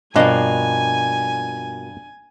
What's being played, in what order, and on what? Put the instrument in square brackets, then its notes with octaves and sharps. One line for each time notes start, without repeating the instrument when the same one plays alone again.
[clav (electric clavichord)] G2 [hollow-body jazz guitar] B2 F3 A#3 [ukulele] D4 D#5 [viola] G#5